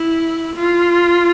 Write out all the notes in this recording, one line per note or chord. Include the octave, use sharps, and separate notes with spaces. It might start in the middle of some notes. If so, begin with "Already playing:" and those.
Already playing: E4
F4